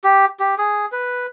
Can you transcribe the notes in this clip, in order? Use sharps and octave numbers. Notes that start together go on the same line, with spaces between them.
G4
G4
G#4
B4